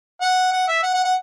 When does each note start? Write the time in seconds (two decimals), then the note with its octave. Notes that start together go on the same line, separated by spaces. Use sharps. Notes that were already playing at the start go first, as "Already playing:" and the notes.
0.21 F#5
0.52 F#5
0.68 E5
0.83 F#5
0.94 F#5
1.05 F#5